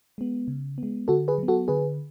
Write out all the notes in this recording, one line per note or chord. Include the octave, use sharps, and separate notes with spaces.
G#3 B3
C#3
G#3 B3
D3 F#4 A4
G#4 B4
F#3 B3
F#4 A4
D3 G#4 B4